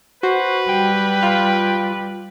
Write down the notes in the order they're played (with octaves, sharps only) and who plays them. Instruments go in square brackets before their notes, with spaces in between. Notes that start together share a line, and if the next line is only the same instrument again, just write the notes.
[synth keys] F#4 [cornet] B4 [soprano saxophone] C5
[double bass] G3 [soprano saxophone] G5
[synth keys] F4